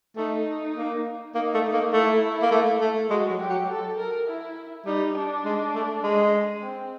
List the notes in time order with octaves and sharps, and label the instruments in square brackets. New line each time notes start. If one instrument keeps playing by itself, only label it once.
[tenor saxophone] A3 [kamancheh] D#4
[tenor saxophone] A#3
[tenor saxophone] A#3 [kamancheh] D#4
[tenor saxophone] A3
[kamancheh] D#4
[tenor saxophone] A#3
[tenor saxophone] A3 [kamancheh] E4
[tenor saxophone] A#3
A3
A3
[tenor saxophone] G#3 [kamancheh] F#4
[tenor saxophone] F#3
[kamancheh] G4
[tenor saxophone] F#3
[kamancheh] A4
A#4
E4
[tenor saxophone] G3 [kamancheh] D#4
[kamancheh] D4
[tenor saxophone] G#3
A3
G#3
[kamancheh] C4